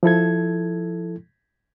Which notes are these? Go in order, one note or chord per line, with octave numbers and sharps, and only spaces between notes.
F3 E4 A4 G#6